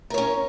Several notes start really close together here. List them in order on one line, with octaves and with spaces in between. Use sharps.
A#4 C#5 C#4